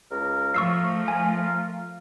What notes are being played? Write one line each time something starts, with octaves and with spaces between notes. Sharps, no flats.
C#2 A#4
F3 A3 F4 C#6 E6 C7
G#5